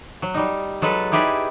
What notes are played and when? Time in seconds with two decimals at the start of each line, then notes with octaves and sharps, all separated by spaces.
0.22 F#3
0.34 G3 D#4
0.82 F#3 G#3 A4 B4
1.12 D#4 E4 G4 G#4 B4 D5